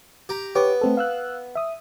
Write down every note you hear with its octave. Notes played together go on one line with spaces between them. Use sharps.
G4 A#5
B3 G4 C#5 D6
A3 C4 A4
F5 E6 F#6
E5 D#6